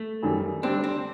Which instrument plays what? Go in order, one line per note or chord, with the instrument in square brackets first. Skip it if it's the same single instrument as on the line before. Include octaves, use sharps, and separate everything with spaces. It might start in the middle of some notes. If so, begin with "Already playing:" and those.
Already playing: [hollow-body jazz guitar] A3
[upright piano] F#2 D#3 G3
[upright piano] D3 G3 C4 [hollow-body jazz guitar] D4
[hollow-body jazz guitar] C4